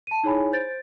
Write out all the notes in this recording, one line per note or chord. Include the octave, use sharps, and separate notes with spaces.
A5 D#7
D#4 E4 G#4 C#5 G#5 B5
C5 G6 A6 D7